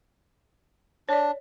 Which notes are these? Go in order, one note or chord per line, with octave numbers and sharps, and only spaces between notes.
D4 C#5 D5